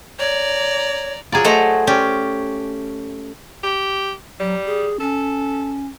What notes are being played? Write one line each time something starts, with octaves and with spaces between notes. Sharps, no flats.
C#5 D5 A#5
F#3 F4 G#4 D5 A#5
A3 C5 D#5 F#5 A#5
C#4 G4 C5 D5
G4
F#3 G3
G#4
C#4 A4